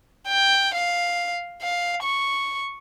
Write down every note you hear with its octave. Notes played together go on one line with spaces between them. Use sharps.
G5
F5
F5
C#6